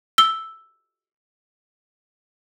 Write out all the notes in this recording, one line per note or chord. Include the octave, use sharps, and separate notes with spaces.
E6 G7